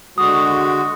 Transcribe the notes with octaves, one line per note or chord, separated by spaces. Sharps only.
D3 G#3 F#4 D#6